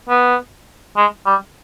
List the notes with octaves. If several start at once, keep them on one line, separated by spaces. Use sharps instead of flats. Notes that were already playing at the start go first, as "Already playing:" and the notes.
B3
G#3
G3